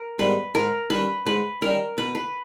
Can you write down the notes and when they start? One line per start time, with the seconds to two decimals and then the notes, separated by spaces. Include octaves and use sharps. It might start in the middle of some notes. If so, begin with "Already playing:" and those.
Already playing: A#4
0.19 G#2 D#3 G3 B3 B4
0.54 G#2 A#4
0.90 D#3 G3 C#4 B4
1.26 G#2 B4
1.61 D#3 G3 C#4 A#4
1.97 B2 B4
2.15 B4